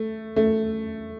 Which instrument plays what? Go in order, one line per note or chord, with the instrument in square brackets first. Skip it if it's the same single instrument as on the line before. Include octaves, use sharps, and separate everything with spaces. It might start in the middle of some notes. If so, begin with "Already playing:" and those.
Already playing: [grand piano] A3
A3